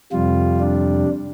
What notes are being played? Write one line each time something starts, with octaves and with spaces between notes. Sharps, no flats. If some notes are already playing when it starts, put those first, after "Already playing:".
F2 C3 G3 F4
D4